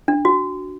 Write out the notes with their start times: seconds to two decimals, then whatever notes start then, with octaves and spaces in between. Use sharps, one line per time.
0.08 D4
0.25 F#4